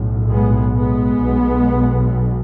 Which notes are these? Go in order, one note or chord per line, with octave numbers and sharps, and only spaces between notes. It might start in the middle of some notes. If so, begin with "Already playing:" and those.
Already playing: B1 A2
G#3 B3
G#3 B3
B1 B2